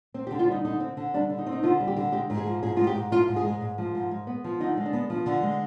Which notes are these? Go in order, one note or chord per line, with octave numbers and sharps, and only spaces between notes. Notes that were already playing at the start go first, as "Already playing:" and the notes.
C4
G4
D3
F4
G3 D#4
D3 D#4
C4
D3
G3 D4
D3
D#4
C4
D#4
D3 F4
G3
G4
D3
G#3 G4
G#2
G#4
F3
G#2 G#4
G#3 F4
G4
G#2
F3 F4
G#2
G#4
G#3
G#2
F3
G#2
G#3
B3
F3
D3 D#4
G#3
D4
B3
F3
D3
G#3